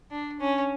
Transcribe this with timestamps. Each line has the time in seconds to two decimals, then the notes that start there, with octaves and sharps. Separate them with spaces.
0.11 D4
0.40 C#4